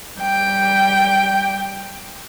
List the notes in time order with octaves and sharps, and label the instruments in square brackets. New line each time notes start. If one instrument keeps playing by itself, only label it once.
[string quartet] G3 G5